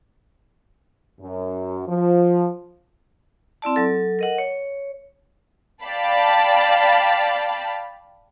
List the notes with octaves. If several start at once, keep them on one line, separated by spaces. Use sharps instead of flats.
F#2
F3
C4 E4 D5 A5
F#3 A4
A#4 D#5 F#5
C#5
D5 F5 G5 A5 B5